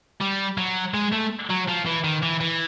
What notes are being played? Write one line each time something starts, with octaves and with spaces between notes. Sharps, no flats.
G3
F#3
G#3
A3
F#3
F3
E3
D#3
E3
E3